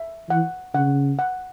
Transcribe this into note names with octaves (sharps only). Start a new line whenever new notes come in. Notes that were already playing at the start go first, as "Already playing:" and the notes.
Already playing: E5
E3 F#5
C#3 F#5
F#5